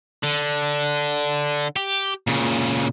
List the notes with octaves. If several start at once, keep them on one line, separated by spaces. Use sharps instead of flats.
D3
G4
A#2 C#3